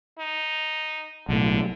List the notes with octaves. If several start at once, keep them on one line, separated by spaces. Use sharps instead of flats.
D#4
B1 A2 D3